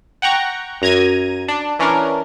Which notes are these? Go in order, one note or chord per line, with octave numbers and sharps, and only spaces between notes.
F#5 G5 A#5 C#6
F#2 A#5 G#6 D#7
D4
E3 C#4 D4 A#4